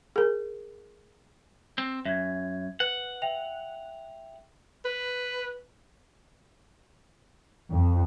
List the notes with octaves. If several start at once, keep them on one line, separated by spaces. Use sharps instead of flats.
G#4 A#4
C4
F#2 E5 G#6
B4 F#5
E5 G5 F7
B4
F2